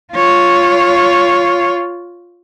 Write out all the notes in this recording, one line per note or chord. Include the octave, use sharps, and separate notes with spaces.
F4 C#5